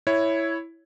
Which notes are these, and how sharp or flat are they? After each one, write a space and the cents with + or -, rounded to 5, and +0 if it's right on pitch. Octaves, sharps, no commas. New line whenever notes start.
E4 +0 C#5 +0